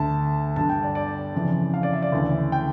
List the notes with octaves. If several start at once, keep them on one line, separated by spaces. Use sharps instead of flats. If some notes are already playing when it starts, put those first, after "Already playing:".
Already playing: D2 D3 A5
G2 D3 A5
G5
D5
D5
F2 C#3 E3
F5
D5
E5
D5
D2 C#3 E3
G5